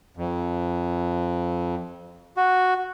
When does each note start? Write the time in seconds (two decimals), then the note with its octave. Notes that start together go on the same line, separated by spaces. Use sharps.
0.17 F2
2.37 F#4